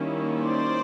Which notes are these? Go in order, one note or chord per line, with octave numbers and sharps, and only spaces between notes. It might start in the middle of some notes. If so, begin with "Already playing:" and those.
Already playing: D#3 G3 A#3 C#4 E4
C5 D5